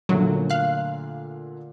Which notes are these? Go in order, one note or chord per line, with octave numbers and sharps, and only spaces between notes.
A#2 D3 F#3 A3
F5 F#6